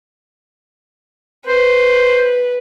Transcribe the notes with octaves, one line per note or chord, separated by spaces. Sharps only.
B4 C5